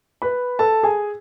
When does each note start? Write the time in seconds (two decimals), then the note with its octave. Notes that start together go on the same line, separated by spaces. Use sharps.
0.22 B4 B5
0.59 A4 A5
0.83 G#4 G#5